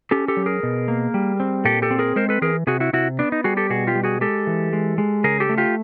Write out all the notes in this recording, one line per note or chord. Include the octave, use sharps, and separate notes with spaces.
C#4 G4 A4
G4 A4
F#3
G#4 A#4
B2
A#3
G3
C4
A#2 G4 A4
G4 A4
C4
G#4 A#4
G#3 A#4 C5
A4 B4
E3 G#4 A#4
C3 F#4 G#4
E4 F#4
C3 E4 F#4
B3 D4
D#4
G3 F#4 G#4
G4 A4
B2 F#4 G#4
F4 G4
G3
F#4 G#4
G#3 G4 A4
E3
G#3
G#3
C#3 G#4 A#4
G4 A4
A3
F4 G4